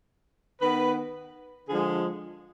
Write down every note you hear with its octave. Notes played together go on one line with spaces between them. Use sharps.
D#3 B3 B4
D3 F3 G#3 G#4